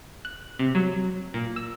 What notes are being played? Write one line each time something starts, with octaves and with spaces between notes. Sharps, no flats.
F#6
C3
F#3
A#2
E6